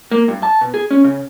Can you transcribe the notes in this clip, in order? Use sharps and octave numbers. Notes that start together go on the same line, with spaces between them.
A#3
G2
A5
B2
G#4
C#4
C#3